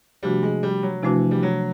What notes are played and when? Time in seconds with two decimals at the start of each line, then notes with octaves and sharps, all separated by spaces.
0.23 C3 F3 G3 A3 D4 F#4
0.43 G#3
0.63 G3
0.83 F#3
1.03 C3 E3 F3 A3 D4 F#4
1.31 G3
1.43 F#3